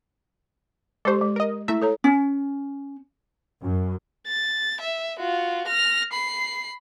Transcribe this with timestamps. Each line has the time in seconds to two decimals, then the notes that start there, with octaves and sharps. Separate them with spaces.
1.05 G#3 G4 A4 C5
1.21 G#3
1.36 A#4 D#5
1.68 A3 E4 E5
1.82 A4 C#5 A#5
2.04 C#4
3.62 F#2
4.27 A6
4.81 E5
5.20 F4 F#4
5.68 F6 A#6
6.13 B5 C7